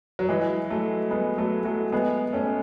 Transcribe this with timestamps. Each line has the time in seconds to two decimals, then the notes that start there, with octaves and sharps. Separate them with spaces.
0.19 F#3
0.29 E3 G#3
0.70 F#3 A3
1.11 G#3 B3
1.38 F#3 A3
1.65 F#3 A3
1.92 G#3 B3
2.33 A3 C#4